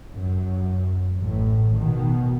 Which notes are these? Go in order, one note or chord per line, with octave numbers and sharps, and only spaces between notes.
F#2
A1 A2
B2 D#3